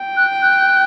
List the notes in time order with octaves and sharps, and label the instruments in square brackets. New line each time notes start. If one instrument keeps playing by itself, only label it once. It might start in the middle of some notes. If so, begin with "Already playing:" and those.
Already playing: [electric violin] G5
[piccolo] F#6
F#6